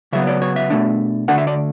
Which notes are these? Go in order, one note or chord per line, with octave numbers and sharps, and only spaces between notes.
C#3 F#3 B3 E5
D5
C#5
E5
B2 A3 D4
D2 D3 A3 D4 F#5
E5
D5